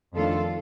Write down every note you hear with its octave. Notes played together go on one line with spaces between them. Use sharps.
F2 D#3 A3 D4 F4 A4